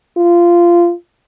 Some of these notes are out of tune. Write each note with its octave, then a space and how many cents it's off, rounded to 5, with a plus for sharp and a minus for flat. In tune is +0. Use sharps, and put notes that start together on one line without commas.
F4 -15